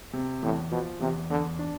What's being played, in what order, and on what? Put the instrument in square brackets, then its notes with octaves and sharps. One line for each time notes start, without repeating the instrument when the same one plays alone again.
[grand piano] C3
[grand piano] E2 [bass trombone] A2
[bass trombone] B2 [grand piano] F3
[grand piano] E2 [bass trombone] C3
[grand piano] E2 [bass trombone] D3
[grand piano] D4